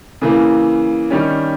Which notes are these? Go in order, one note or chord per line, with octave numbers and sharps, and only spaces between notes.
C#3 E3 A#3
D#3 G3 C#4